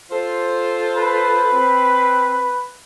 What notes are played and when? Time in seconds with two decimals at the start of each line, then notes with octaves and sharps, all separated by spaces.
0.10 F4 A4 C5
0.96 B4
1.53 C4